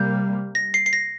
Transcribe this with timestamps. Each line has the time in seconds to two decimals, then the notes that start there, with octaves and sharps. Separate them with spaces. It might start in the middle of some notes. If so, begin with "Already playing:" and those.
Already playing: C3 G3 A#3 G6
0.55 A#6
0.74 C7
0.86 C7
0.93 A#6